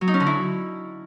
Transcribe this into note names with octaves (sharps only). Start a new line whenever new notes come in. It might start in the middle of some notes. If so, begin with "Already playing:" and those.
F#3
D#4
C#4
D3
E4